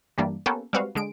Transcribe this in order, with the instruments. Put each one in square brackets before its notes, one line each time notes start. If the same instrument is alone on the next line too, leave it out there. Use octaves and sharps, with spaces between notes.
[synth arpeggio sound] G2 E3 G3 A#3 D4
A#3 B3 C#4 G4 A4
G3 G#3 C4 F#4 B4 F5
D3 G#3 D7